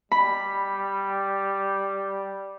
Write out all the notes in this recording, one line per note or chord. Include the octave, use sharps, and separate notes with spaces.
G3 B5